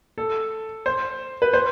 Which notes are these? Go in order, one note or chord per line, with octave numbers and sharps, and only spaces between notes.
A4
C5
B4
C5